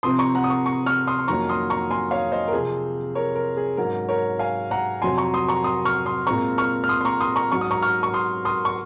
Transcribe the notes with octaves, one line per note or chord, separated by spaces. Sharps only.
C3 F3 C4 C6 D#6
A#5 C#6
F#5 A#5
D#6
A#5 C#6
A#5 C#6
C#6 F6
C6 D#6
C6
F2 D#3 F#3 A#3 C#4 A#5 C#6
C6 D#6
A#5 C#6
G#5 C6
C#5 F5
C5 D#5
A#4
C3 F3 C4 G#4 C5
A#4 C#5
A#4
G#4
G#2 F#3 C#4 A#4
A#4 C#5
F5 G#5
F#5 A#5
F2 C3 F#3 C4 G#5 C6
A#5 C#6
C6 D#6
A#5 C#6
C6 D#6
C#6 F6
C6 D#6
A#2 G#3 C4 A#5 C#6
C#6 F6
F6
C6 D#6
C6
A#5 C#6
C6 D#6
A#5 C#6
G#2 F#3 C#4 C#6
D#6
A#5 C#6
C#6 F6
C#6
C6 D#6
C6 D#6
C#6